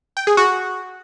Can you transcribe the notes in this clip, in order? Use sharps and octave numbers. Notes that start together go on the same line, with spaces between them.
G5
G#4
F#4